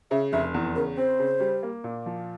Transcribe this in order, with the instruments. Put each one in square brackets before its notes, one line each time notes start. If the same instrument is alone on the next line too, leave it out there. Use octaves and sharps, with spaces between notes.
[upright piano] C#3 [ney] E5
[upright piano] F1 [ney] E5
[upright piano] E2
[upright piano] C#3 [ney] A#4
[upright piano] C4 [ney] C5
[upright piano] C#3
G3
A#3
A#2
F3